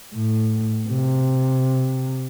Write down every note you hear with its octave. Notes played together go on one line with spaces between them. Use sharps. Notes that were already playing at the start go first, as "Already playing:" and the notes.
A2
C3